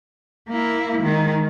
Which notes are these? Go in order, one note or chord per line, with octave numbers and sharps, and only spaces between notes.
A#3 E4
D#3 G#3